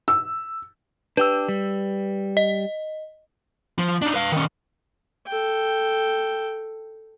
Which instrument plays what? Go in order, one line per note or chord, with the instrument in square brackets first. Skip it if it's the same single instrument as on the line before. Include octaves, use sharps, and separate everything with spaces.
[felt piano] E6
[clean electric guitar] D4 G4 [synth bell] B4 E6
[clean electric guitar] G3
[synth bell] D#5
[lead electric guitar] F3
D4 D#4
B4 F5
D#3 C#4
[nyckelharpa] A4 G5